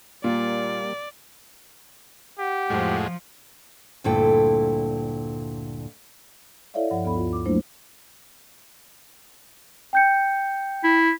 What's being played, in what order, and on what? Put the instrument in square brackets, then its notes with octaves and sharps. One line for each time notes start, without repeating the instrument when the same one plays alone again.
[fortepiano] A#2 [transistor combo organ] G3 A#3 [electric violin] D5
[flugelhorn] G4 [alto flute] F#5
[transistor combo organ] F2 A2 G#3 [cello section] F3
[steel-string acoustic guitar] D2 G2 A#2 E4 A4 G5
[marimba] E4 A4 C#5 D5 E5 F5
G2 F3 F#5
D2 B3 A4 B5
F4
D6
F#3 A3 A#3 D4 E4 C5
[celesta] G5 G6 C#7
[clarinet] E4